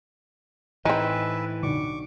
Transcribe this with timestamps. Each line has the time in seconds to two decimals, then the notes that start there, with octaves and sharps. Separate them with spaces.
0.85 A2 E3 C4 D#4 B4 E5 G#5
1.63 B1 D3 C#6 D6